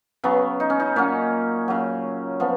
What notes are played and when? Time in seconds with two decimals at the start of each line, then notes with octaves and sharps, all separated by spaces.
0.24 C#3 F#3 B3
0.60 D#4
0.70 C#4
0.80 D#4
0.96 A#2 F#3 C#4
1.68 C#3 F#3
2.40 F3 B3